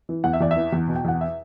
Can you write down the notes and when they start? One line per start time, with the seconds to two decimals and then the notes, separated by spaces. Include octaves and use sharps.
0.09 E3
0.24 E2 F#5
0.33 E5
0.40 E2 D5
0.51 E5
0.56 E3
0.72 E2
0.88 B2
0.96 G5
1.05 E2 F#5
1.21 E5